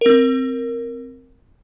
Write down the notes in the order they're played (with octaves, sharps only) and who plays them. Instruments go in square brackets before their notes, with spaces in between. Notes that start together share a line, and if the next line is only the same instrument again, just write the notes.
[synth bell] C4 A#4